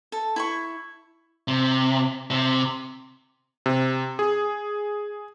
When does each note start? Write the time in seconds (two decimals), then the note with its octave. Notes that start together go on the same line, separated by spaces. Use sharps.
0.12 A4
0.36 E4 B5 C#6
1.48 C3
2.30 C3
3.66 C3
4.19 G#4